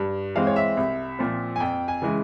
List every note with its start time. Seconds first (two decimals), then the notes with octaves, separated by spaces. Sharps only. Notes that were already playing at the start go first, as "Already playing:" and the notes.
Already playing: G2
0.35 E3 G#3 C4 F5
0.47 C#5
0.56 E5
0.77 C2
1.19 A#2 F3 C4
1.56 G#5
1.60 F2 G5
1.88 G#5
2.02 C#3 E3 G#3